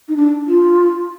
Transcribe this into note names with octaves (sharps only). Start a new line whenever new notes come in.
D#4
D4
F4